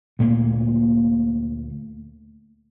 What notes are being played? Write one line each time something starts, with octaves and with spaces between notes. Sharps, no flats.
D2 A#2 A3 A#3